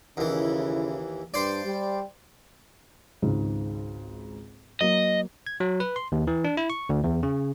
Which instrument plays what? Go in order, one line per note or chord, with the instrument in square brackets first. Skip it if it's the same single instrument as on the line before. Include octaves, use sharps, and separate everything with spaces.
[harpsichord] D#2 E3 [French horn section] C#3 E4
[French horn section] G2 [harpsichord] C5 D5
[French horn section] G3
[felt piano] G#1 C#2 G#2
[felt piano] F#3 A#3 [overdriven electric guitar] D#5
[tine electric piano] G#6
F#3
B4
C6
D#2
E3
D4
E4
C#6
D2
E2
C#3